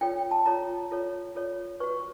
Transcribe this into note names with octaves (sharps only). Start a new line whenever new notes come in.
F4 A4 C#5 G5
A5
F4 A4 C#5 A#5
F4 A4 C#5
F4 A4 C#5
F#4 B4 C#6